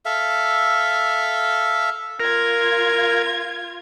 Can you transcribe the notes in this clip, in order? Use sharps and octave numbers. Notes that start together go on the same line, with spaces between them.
A4 E5 F5
F4 A#4 G#6